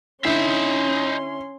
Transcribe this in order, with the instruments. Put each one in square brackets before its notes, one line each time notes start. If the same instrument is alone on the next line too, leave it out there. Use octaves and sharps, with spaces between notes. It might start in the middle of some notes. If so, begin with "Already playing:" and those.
[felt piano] D3 E4 C7 [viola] C#4 C6 [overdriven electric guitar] D#4 E5